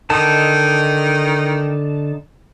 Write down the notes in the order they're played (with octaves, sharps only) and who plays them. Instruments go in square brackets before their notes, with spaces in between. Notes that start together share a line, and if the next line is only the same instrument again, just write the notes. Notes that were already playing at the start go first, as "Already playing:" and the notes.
[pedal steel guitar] D3 D#4 A5 [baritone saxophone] D#3